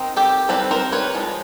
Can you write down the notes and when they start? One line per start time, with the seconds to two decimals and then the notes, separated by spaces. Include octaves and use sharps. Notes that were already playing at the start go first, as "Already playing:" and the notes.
Already playing: D#3 C4 D#4
0.17 G4 A4
0.49 D#3 G3 C4 A4 B4
0.71 A#4 C5
0.92 B4 C#5
1.15 F3 G#3